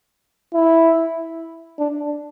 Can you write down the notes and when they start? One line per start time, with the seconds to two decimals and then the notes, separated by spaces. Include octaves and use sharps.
0.53 E4
1.79 D4